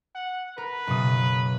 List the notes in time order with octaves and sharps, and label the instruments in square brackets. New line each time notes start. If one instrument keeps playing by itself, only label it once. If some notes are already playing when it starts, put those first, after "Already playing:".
[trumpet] F#5
[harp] A#4 [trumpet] B4
[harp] F#1 B2 D#6